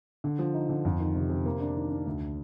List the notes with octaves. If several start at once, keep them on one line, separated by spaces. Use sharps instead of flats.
D3
F3
D#4
D3
F2
D#3
C3
C3
A#3
D4
D#3
D4
D2